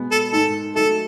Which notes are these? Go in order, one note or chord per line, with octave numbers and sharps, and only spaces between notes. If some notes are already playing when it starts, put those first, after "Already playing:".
Already playing: B2 G#3 B3
A4
G#2 D#3 G#3 D#4 A4
D#3 F#3 A3 D#4 A4